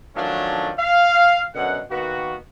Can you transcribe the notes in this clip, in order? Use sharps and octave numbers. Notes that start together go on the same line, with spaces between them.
D#3 F3 F#3 A3 C#4 D4
F5
F#2 B2 D3 F#5
D#3 A#3 B3 F#4